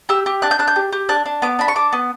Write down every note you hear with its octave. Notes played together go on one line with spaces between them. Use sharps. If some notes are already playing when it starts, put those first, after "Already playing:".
G4 E6
G4
D4 F#6
G6
D4 F#6
G6
G4
G4
D4 F#6
D4
B3 D6
D4 B5
C#6
D4 D6
B3